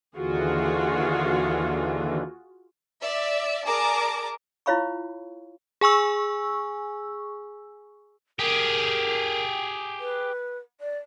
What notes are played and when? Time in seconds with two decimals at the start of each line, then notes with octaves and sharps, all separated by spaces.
0.15 D#2 D3 E3 F4 F#4 G#4
3.02 D5 E5
3.66 G#4 A#4 D5 A5 A#5 D6
4.66 E4 F4 C#5 F5 B5 C#6
5.81 G#4 G#5 C#6 E6
8.39 G4 G#4 A#4
10.00 B4
10.80 D5